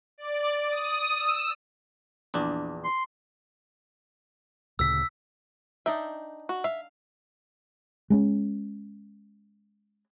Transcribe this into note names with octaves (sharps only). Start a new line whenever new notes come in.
D5
D#6
E6
A#1 E2 D4
C6
D2 A#2 C#3 E6 B6
D4 D#4 E5 G5
F#4
E5 F5
G#3 A#3 C#4